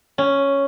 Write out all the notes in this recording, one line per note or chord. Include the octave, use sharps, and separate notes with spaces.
C#4